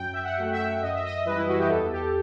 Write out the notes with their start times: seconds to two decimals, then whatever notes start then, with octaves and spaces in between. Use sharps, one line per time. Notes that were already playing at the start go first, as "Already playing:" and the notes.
Already playing: F#2 G5
0.13 E5
0.23 F#5
0.37 F#3 A3
0.53 E5
0.82 F#2 D#5
0.94 E5
1.06 D#5
1.25 E3 G3 B4
1.37 E4
1.48 F#4
1.58 G4
1.69 E2 A4
1.92 G4